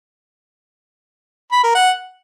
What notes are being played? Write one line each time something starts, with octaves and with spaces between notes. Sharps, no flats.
B5
A#4
F#5